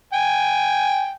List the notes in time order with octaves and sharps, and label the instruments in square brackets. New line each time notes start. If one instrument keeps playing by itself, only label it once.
[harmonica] G5 G#5